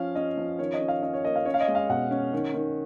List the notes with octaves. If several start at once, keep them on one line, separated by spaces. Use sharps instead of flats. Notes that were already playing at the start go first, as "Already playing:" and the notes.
Already playing: F3 C#4 F5
C#4 D#5
F3
D#3 C#5
D#5
C#4
F5
C#4 D#5
C#5
A#3 D#5
F5
C#4 C#5
F5
D#5
G#3
F5
B2 F#5
C#4
D#3
D#3